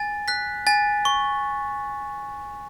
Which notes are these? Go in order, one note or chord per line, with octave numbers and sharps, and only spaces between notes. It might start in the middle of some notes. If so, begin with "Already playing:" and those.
Already playing: G#5 A6
F#6 B6
G#5 A6
C#6